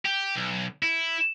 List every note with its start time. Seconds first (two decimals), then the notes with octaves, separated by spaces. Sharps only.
0.06 G4
0.36 B1
0.83 E4